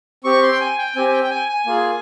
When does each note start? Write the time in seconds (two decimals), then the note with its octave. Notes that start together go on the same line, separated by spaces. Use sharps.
0.24 C4 G4 C#6
0.43 C6
0.52 G5
0.60 G#5
0.78 G5
0.95 C4 G4 G#5
1.08 G#5
1.13 G5
1.23 G5
1.30 G#5
1.48 G#5
1.66 A#3 F4 G#4